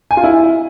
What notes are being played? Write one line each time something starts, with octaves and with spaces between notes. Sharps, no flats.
G#5
F4
E4